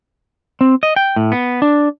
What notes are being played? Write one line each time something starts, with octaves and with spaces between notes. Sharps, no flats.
C4
D#5
G5
A2
B3
D4